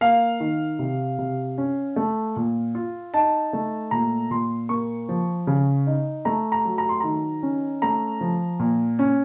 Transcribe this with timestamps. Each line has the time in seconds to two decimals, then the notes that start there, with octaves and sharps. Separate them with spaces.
0.01 A#3 F5
0.40 D#3
0.79 C3
1.19 C3
1.58 C#4
1.96 A3
2.36 A#2
2.75 F4
3.14 D#4 A5
3.53 A3
3.91 A#2 A#5
4.31 A#2 C6
4.69 A#3 C#6
5.09 F3
5.47 C#3
5.87 D#4
6.25 A3 A#5
6.52 A#5
6.65 F#3
6.78 A#5
6.89 C6
7.00 D#3 A#5
7.43 C#4
7.82 A3 A#5
8.21 F3
8.59 A#2
8.99 C#4